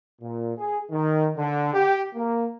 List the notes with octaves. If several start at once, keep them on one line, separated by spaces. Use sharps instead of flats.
A#2
G#4
D#3
D3
G4
A#3